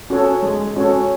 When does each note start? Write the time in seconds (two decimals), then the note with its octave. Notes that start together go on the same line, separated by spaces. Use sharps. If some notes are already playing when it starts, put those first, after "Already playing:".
0.10 C#4 F#4 A4 C#5
0.43 G#3
0.76 C#4 F#4 A4 C#5